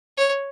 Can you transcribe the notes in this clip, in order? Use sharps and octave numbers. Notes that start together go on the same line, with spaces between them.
C#5